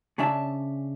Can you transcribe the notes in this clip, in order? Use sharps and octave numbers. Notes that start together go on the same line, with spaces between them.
C#3 C#4 D4 D5 E5 A5